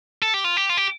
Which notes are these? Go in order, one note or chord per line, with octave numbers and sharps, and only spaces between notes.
A4
G4
F4
G4
F4
G4